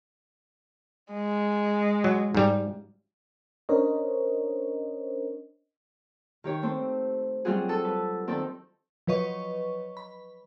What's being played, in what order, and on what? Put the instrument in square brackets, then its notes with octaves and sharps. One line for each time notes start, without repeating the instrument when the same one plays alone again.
[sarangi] G#3
[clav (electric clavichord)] F#3
G#2 G3
[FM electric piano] C#4 D4 A#4 C5 C#5 D#5
[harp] D#3 G4 C#5
A3 C4 C5
F#3 G3 C4 F4 F#4 G#4
A4
B4
D#3 C4 D#4 A4 D5
[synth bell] F3 F#3 B4 C#5 D#5 C#6
B5